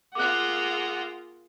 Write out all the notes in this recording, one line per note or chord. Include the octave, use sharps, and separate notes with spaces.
A#3 F4 G#4 F#5 D6 F#6